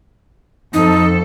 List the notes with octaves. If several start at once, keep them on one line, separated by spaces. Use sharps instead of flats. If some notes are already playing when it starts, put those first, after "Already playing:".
F2 D#4 A4